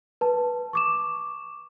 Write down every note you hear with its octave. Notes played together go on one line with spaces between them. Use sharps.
B4 A5
C#6 D6 E7